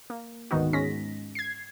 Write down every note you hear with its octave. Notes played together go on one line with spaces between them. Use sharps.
A#3
D2 G#2 D#3 B3 D#4 F#4
G#2 G#3 C#4 A#6 B6
G#6 C7